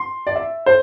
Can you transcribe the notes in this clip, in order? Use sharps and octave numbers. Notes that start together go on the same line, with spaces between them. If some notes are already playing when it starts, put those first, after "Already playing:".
Already playing: C6
D5
E5
C5